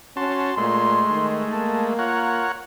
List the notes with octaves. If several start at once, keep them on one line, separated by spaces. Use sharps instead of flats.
C#4 F#4 A5 C6
A#2 G#3 A3 C6
D#3
A#3 A5
F4 A#4 C#5 F#5